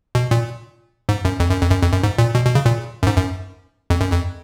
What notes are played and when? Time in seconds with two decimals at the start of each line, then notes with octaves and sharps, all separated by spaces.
0.15 B2
0.31 A#2
1.09 G#2
1.25 F#2
1.40 F2
1.51 F#2
1.62 F2
1.71 F#2
1.82 F2
1.92 F#2
2.03 G#2
2.18 A#2
2.35 B2
2.45 B2
2.55 C#3
2.66 A#2
3.03 F#2
3.07 G#2
3.17 F#2
3.90 F2
4.00 F#2
4.12 F2